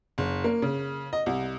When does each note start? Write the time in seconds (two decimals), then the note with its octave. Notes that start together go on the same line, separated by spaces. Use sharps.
0.18 F#1
0.44 A#3
0.62 C#3
1.13 D#5
1.26 C2